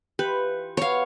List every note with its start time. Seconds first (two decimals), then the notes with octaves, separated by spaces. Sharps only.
0.19 E3 F4 G4 B4
0.77 B2 C#5 F5